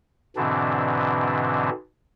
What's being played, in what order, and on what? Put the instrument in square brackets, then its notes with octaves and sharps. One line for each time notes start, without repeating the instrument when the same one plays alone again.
[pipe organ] G#2 B2 D3 E3 C4 D4